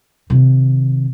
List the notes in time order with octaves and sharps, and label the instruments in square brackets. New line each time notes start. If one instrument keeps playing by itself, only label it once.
[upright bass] C3 D#3